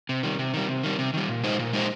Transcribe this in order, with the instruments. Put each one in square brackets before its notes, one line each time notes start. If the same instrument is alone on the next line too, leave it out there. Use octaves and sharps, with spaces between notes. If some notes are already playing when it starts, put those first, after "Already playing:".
[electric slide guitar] C3
D#3 G3
C3
D#3 G3
C3
D#3 G3
C3
D#3 G3
A#2
G#3 D#4 G4 C5
A#2
G#3 D#4 G4 C5